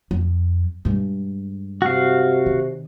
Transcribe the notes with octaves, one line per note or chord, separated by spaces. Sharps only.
F2
G2 G#3
C3 F#4 F5
D#3